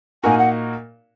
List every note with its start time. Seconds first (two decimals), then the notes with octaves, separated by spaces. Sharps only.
0.23 A#2 A#3 D#4 F#4 A#4 G#5
0.39 F#5